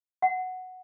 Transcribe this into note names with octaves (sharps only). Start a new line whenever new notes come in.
F#5